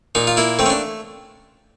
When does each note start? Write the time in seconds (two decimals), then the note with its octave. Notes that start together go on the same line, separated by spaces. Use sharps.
0.15 A#2 D#4
0.27 F4
0.37 A#3 E4
0.59 A3 C4
0.66 C#4
0.70 D4